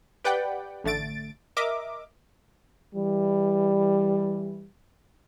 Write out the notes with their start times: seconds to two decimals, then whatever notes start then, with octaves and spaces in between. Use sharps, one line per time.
0.24 G4 B4 D5 F#5 G5
0.84 A1 D3 A3 A6 D7
1.57 A#4 D#5 E5 D6
2.95 E3 G3